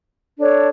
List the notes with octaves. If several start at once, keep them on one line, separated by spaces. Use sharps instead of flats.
D4 A4 C#5